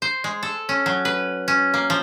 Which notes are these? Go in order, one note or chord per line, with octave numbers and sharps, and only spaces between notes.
C5
G#3
A4
C#4
F#3
B4
C#4
A#3
F3